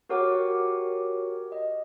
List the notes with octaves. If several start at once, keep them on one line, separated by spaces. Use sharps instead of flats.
F#4 G4 A#4 C#5 F#5 D6
D#5